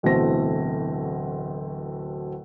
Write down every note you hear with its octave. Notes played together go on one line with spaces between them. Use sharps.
D1 B2 E3 A3 C4 A#6